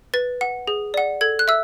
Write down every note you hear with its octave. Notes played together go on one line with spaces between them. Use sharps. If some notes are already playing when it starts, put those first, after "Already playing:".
B4 A6
F#5
G#4
D5 F#5
A4 G#6
F#6
E5 E6